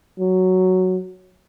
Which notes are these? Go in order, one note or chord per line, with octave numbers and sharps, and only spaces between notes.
F#3